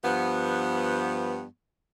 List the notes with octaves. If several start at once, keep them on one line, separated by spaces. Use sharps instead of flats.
G2 F3 B3